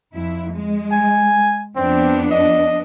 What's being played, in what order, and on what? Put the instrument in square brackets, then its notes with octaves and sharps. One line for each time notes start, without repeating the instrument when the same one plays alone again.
[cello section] F2 E4
G#3
[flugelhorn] G#5
[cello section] F2 B3 D4 [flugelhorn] C4
[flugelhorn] D#5